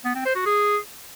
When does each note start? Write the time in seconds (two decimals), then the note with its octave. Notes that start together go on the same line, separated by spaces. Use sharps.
0.04 B3
0.15 C4
0.25 C5
0.35 F#4
0.46 G#4